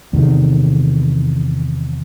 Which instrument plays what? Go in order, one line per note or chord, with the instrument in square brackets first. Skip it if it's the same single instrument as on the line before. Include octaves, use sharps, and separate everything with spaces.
[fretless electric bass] E2 C3 D#3